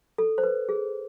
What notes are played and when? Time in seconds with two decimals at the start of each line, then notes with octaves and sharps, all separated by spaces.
0.18 A4
0.38 C5
0.43 B4
0.69 G#4